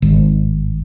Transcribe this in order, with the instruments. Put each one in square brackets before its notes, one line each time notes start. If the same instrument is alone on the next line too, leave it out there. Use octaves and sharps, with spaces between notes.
[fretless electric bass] G#1